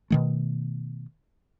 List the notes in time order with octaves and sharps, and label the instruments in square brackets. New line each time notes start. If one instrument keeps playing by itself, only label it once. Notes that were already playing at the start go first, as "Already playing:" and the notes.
[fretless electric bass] B2 D#3 A3